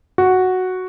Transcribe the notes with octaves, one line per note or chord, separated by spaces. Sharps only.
F#4